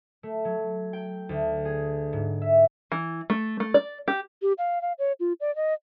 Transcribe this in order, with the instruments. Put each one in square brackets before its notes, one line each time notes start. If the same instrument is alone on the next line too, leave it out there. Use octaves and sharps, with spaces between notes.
[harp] A3
F#3
G5
D2
G#4
G#2
E5
[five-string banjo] E3
A3
A3
D5
G4
[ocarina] G4
F5
F5
C#5
F4
D5
D#5